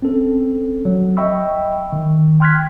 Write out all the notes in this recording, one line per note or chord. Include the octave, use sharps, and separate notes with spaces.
C4 C#4 A4
F#3
D#5 E5 G5 B5 C#6 E6
D#3
G5 C6 F6 F#6 G#6 B6